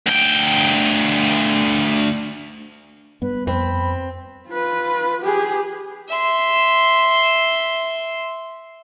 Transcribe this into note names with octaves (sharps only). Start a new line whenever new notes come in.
D2 G5
G2 G3 B3 B4
F2 C4 B5
F4 B4
G4 G#4
E5 C6